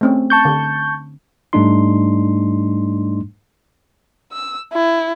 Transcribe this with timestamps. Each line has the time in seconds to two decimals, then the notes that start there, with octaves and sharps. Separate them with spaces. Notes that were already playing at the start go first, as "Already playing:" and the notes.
0.01 A3 C4 C#4
0.30 A5 C#6 G6
0.45 D3
1.53 G#2 G3 A3 D4 D#4 C6
4.32 E6
4.73 E4